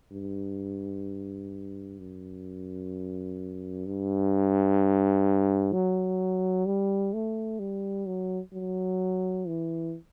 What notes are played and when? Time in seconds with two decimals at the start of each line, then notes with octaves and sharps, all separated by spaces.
0.12 G2
1.99 F#2
3.86 G2
5.73 F#3
6.66 G3
7.13 A3
7.59 G3
8.06 F#3
8.53 F#3
9.47 E3